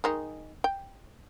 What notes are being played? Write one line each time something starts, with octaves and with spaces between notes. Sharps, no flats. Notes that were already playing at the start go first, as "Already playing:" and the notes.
D#3 G#3 D#4
G5